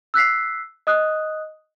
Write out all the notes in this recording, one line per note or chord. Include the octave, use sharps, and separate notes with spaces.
E6 F#6 B6 C7
D#5 D#6 F#6